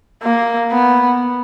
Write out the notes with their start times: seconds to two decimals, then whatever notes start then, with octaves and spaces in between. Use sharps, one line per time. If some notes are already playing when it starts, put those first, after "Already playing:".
0.23 A#3
0.71 B3